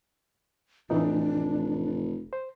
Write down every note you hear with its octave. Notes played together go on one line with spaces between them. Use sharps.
F1 A2 E3 D4 D#4
C5